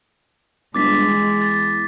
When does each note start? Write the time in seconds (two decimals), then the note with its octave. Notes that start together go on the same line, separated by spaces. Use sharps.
0.75 G1 G#3 D6 A6 B6
1.08 E2
1.42 A6